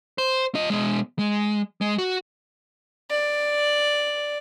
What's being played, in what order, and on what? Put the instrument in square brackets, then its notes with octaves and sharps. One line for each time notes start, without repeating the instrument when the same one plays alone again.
[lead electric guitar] C5
F4 D#5
B2 G#3
G#3
G#3
F#4
[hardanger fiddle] D5